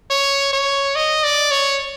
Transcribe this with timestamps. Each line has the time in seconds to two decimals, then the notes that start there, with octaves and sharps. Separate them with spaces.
0.10 C#5
0.53 C#5
0.95 D#5
1.24 D5
1.51 C#5